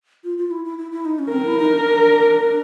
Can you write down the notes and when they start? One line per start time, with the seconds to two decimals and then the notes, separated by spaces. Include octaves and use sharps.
0.24 F4
0.38 F4
0.51 E4
0.65 E4
0.78 E4
0.92 E4
1.05 D#4
1.19 C#4
1.32 C4 A#4
1.45 E4
1.59 D#4
1.73 D4